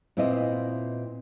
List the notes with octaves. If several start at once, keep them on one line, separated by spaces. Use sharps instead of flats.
A#2 C4 E4 B4 D#5